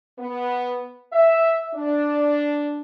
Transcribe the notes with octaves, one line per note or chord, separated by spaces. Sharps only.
B3
E5
D4